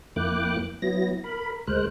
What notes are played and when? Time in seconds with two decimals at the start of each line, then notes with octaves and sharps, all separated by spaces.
0.16 F2 A#3 E4 G5 D6 F#6
0.82 F#3 B3 E4 A#6
1.24 A#4 B5
1.67 D2 G#3 A#4 C5 F#6